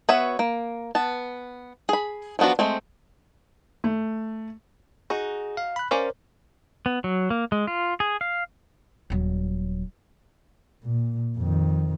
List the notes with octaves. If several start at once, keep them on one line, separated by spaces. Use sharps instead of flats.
B3 F#4 B4 C#5 E5
A#3
B3 A5
G#4 B5
F3 F#3 B3 D4 F#4
G#3 A3 C4
A3
D#4 F#4 G#4
F5
B5 F#6
C#4 A#4 C5 D5 F5
B3
F#3
A#3
G#3
F4
G#4
F5
D#1 F#3
A#2
F2 D#3